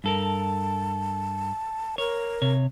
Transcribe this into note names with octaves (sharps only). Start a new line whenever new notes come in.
G2 A4 A#4 A5
A#4 C#5
C3 C#5